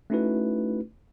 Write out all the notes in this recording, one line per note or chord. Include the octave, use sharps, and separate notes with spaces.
A3 C#4 D#4 E4 F#4 B4